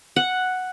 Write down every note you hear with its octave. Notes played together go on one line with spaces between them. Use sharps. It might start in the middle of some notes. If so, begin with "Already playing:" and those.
F#5